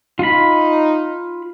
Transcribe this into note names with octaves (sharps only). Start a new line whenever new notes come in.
D#4 F4 B5